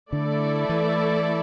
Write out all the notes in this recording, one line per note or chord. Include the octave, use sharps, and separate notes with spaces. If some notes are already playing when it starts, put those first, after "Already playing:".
D3 A3 E4 A4 D5
E3